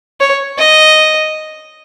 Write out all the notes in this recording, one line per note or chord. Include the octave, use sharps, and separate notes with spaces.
C#5
D#5